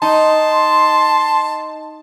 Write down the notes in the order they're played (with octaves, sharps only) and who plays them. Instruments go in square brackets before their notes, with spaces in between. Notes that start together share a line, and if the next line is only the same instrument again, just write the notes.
[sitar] D#4 [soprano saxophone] A5 [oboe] C6